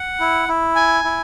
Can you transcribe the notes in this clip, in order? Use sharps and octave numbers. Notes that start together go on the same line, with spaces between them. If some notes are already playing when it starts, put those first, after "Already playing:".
Already playing: F#5
E4
E4
G#5
E4